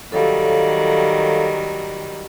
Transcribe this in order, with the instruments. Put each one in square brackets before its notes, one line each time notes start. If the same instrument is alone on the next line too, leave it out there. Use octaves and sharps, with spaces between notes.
[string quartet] D#3 F#3 G3 [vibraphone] A4 C#5 F5